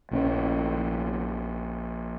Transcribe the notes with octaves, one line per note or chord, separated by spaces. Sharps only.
A#1 C4 C#4